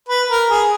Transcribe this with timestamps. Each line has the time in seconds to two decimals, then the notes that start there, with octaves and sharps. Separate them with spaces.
0.09 B4
0.30 A#4
0.49 G#4